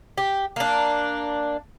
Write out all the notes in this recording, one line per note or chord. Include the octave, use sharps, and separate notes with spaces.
G4
A#3 D4